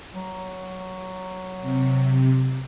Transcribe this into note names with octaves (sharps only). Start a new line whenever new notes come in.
F#3
C3